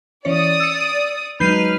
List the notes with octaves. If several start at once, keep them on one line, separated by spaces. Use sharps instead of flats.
E3 C#4 C#5 D5 D#6
E6 C#7
F#3 G#3 D#4 B4 F6 G6 C7 D#7